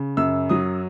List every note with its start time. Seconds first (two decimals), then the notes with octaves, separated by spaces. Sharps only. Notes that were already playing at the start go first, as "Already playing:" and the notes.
Already playing: C#3
0.17 F#2 E6
0.49 F#3 D#6